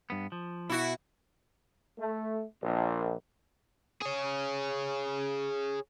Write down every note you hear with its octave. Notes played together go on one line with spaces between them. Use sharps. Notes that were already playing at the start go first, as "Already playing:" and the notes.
G2 B3
F3
B2 E4 F#4
A3
A#1
G#4 C#5